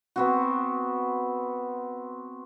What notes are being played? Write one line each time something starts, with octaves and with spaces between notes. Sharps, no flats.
B3 C4 F#4